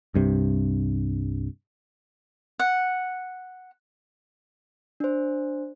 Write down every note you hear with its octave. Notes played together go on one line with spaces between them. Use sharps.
C2 G2 C3
F#5
D4 C5